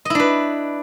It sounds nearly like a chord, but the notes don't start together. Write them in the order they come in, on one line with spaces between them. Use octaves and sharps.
D#5 E4 D4 B4